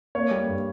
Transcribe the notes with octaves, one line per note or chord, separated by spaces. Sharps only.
A#3 C#5
G3
G2